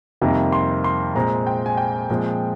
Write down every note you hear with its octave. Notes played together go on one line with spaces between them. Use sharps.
F2 C3 D#3 G3 A#3 A#5
C6
C6
A#2 G#3 C4 A#5
G5
G#5
G5
A#2 F3 G#3 C4